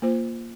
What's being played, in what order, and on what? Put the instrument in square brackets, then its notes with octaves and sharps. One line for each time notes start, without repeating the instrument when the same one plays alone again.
[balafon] A#3 F4 C5